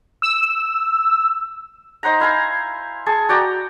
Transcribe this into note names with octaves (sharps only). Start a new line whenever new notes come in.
E6
D#4 C5 F#5 A#5
E4 F5 G#5 A#5
G#4 A5 C#6
F#4 D5 G5 A#5